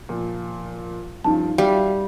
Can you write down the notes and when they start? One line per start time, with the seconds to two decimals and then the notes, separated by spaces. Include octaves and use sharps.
0.09 A#2 F3
1.24 G2 C#3 F3 D#4 A5
1.58 G3 F#4 E5 F5